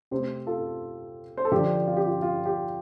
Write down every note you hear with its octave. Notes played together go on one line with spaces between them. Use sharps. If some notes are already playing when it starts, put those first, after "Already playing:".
C3 A3 C4 G4 C5
F4 A4
C5
A4
D3 F3 D4 G4
F4
G4
F4
F4
G4